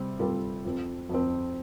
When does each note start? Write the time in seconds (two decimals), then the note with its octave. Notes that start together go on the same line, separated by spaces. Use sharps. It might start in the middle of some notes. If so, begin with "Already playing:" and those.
Already playing: C3 G3 C4
0.19 C3 G3 C4 F4 A4
0.64 F2 F3 C4
1.09 F2 F3 C4